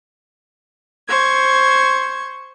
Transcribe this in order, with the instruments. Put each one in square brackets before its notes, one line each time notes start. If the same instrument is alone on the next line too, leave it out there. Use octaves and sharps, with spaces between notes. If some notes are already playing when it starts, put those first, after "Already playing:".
[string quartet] C5 C#6 G#6